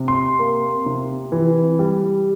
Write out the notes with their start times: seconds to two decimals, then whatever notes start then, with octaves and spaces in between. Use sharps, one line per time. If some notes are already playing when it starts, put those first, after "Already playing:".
Already playing: C3
0.08 C6
0.39 A#3
0.86 C3
1.32 E3
1.79 G3